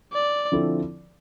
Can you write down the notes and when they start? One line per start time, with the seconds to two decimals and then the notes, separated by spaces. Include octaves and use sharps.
0.13 D5
0.52 D3 F3 C4 E4 A4